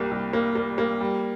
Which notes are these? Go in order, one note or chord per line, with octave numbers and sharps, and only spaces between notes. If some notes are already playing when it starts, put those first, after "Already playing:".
Already playing: C2 G3 A#3
C2
A#3
A#3
A#3
G3